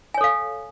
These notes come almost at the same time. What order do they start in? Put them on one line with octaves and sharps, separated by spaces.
G#5 C#5 A4 F5